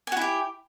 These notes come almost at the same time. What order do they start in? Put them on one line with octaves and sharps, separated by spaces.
G#5 F#4 E4 G4